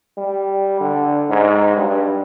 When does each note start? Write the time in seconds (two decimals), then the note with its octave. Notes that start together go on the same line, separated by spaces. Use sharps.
0.18 G3
0.80 D3
1.30 G#2
1.76 G2